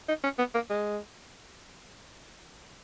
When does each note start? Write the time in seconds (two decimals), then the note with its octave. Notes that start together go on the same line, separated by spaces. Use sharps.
0.08 D#4
0.24 C#4
0.39 B3
0.55 A#3
0.70 G#3